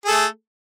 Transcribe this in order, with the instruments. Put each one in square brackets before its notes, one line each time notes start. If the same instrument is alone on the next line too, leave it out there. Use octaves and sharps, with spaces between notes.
[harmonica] G#4
A4
A3